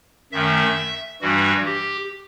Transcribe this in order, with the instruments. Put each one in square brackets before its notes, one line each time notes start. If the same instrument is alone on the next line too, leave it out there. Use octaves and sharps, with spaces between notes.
[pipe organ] F#2 D#3 A3 E5
G2 E3 G3 F#4
G4